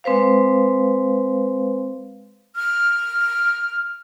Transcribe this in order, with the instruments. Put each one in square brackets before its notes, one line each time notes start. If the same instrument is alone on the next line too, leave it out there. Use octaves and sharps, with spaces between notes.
[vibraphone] G#3 C4 B4 C5 F5
[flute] F6